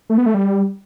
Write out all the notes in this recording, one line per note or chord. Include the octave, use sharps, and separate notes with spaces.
A3
B3
A3
G3